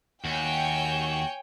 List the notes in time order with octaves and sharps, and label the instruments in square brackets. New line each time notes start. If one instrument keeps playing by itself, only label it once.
[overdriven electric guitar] D#2 [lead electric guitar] F#4 [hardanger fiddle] C#5 G#5 [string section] G5